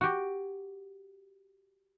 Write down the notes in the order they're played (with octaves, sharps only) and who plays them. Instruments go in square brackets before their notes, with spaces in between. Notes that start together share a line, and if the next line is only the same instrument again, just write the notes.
[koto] F#4 G4